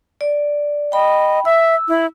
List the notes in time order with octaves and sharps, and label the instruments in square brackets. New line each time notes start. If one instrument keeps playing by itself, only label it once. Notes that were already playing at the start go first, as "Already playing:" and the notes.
[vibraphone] D5
[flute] D#5 [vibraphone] G5 B5
[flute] E5 [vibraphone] E6
[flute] E4